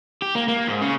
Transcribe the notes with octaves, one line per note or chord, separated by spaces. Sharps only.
G4
A#3
A#3
G#2
C#3 C#4